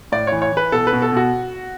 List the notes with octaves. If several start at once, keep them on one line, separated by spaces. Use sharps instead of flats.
A2 D5
E3 C#5
C#5
E3 B4
B2 A4
B4
B2
A4
B2 F#4